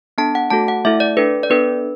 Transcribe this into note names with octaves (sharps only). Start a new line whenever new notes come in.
B3 D4 A4 A5
F#5
A3 F#4 A4 A5
F#5
A3 E4 A4 E5
D5
D4 A4 B4
D5
B3 D4 A4 B4